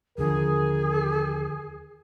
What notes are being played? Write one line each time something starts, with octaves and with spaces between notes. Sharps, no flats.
D#2 D3 F3 G#4 A#4